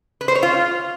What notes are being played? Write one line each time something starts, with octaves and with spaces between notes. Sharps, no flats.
B4
C5
C#5
F4